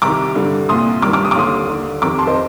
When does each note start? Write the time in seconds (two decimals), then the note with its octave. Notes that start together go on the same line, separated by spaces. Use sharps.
0.02 C2 C3 D#3 A#5 D6
0.36 G2 D3
0.69 C2 A#2 C6 D#6
1.02 G2 D6 F6
1.05 D#3
1.13 D6 F6
1.25 D#6
1.31 D6
1.35 D#2 D3 C6 D#6
1.69 D#2 D3
2.02 F2 C3 D#3 A#5 D6
2.18 A5 C6
2.27 C5 D#5